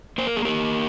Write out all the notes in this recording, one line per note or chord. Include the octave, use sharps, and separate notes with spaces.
A#3 C5
A#4
G#4
A#3 G4 A#4